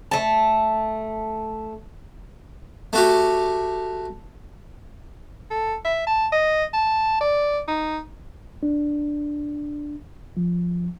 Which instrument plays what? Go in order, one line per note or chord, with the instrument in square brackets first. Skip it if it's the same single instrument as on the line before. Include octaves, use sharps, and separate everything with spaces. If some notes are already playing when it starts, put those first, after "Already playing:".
[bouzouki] A3 A5
[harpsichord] A3 F#4 G4
[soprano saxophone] A4
E5
A5
D#5
A5
D5
D#4
[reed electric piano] D4
F3